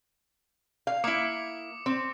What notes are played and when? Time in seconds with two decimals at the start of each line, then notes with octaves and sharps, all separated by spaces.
0.87 F5
1.04 A#3 E4 D6 D#6 C#7
1.86 C4